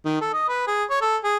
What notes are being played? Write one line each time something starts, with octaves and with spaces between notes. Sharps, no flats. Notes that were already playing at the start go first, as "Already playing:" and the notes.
D#3
A4
D#5
B4
G#4
C#5
A4
G#4